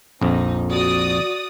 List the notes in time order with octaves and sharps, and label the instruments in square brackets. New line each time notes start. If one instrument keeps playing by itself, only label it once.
[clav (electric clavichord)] A#1 F2 [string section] D#4
[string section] F#4 D5 D#6